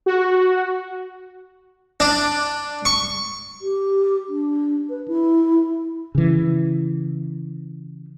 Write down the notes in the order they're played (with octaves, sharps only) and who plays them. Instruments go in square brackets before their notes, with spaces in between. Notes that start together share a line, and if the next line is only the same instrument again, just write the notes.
[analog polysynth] F#4
[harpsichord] D4
C#6
[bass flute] G4
D4
B4
E4
[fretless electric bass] C#3 E3